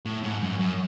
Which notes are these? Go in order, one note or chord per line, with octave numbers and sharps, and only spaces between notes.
A2
G#2
F#2
F#2